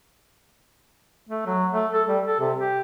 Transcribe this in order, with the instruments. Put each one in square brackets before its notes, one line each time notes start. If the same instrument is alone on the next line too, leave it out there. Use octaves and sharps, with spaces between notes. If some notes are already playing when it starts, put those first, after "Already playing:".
[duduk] A3
F#3
A3
A4
G3
A4
C3
G4